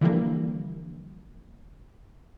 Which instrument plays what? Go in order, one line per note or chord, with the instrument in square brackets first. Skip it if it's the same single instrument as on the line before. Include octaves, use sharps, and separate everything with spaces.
[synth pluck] D3 E3 F3 G3 A#3